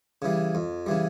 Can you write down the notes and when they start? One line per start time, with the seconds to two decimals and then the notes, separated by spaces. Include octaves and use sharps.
0.22 C#3 E3 G3
0.55 F2
0.86 C#3 E3 G3